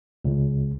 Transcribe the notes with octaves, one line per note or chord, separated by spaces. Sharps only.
C#2